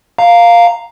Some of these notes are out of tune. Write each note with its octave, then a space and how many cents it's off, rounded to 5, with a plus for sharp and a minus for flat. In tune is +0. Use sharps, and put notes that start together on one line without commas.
F5 +0 A#5 -10